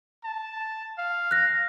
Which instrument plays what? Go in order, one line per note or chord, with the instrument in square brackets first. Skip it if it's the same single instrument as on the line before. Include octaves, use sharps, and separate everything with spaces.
[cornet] A5
F5
[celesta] F#6 A#6